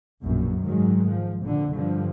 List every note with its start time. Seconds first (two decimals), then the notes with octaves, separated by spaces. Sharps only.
0.24 A#1 F#2 B2
0.63 G#2 D#3 F#3 G#3
1.11 F3
1.43 F2 A#2 D3
1.75 G2 D3 F3